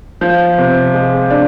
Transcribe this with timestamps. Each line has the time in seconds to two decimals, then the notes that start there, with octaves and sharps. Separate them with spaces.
0.21 F3
0.58 C3
0.94 G#3
1.30 D4